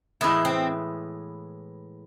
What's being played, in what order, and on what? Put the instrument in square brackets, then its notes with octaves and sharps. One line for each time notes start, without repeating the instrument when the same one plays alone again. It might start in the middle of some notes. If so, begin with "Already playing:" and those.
[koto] A2 E3 G#3 B3 [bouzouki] E4
[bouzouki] C4